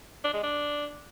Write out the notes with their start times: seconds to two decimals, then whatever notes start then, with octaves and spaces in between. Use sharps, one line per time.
0.24 D4
0.33 G#3
0.43 D4